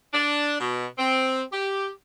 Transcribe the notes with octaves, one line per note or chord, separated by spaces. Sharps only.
D4
B2
C4
G4